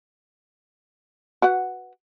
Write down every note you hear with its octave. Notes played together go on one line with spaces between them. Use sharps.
F#4 B4 F#5